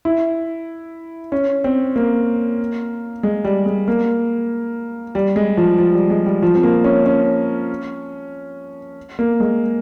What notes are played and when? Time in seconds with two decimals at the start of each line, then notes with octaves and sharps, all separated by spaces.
0.05 E4
1.32 C#4
1.64 C4
1.96 A#3
3.23 G#3
3.45 G3
3.66 G#3
3.88 A#3
5.15 G3
5.36 G#3
5.57 F3
5.79 F3
5.95 G3
6.10 G#3
6.26 G3
6.43 F3
6.55 C4
6.63 A#3
6.84 C#4
7.06 C#4
9.19 A#3
9.40 G#3